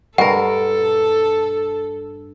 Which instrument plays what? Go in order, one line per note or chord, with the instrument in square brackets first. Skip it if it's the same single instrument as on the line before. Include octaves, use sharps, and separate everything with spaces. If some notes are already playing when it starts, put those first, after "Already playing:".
[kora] G2 A#4 [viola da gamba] A4 [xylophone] F#5